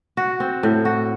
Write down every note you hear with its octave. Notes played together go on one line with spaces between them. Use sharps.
F#4
C4
A2
F#4